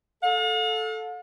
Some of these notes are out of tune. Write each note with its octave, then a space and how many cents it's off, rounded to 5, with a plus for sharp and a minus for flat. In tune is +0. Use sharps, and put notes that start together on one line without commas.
A4 -5 F5 +45